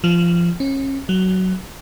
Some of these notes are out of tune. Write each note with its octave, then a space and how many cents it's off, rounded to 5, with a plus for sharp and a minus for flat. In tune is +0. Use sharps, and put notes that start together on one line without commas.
F3 -20
C#4 -30
F#3 +10